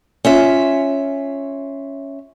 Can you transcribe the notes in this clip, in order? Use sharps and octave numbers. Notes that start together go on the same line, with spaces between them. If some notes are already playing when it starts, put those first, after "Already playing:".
C#4 F4 E5